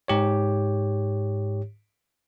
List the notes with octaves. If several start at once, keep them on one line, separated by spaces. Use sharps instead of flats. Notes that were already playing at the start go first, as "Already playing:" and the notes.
G#2 G4 C#5